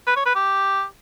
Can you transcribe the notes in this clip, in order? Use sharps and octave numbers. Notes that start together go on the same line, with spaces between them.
B4
C#5
B4
G4